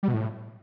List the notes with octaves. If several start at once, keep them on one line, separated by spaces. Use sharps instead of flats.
G3
B2
A2